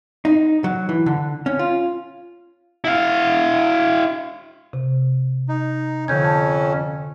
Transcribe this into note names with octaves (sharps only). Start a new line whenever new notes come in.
D#4
F#3
E3
D3
C#4
F4
E4 F5
C3
D#4
F2 D3 C#4 G6 G#6
A5